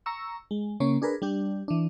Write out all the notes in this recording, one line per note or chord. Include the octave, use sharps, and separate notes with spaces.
A#5 C#6 E6
G#3
C#3 A#3 C#4 C#5
D4 G#4 A#4 B4
G3 D4 G4
E3 D4